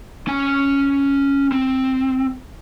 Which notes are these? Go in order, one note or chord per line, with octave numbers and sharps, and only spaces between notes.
C#4 G#5
C4